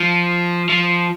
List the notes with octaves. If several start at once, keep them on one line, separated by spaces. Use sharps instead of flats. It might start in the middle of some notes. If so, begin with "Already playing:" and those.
Already playing: F3
F3